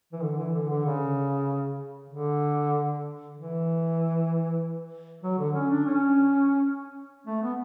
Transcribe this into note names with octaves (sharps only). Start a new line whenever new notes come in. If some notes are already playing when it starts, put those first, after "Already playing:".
E3
D3
E3
D3
D3
C#3
D3
E3
F#3
D3
C#4
D4
C#4
A3
B3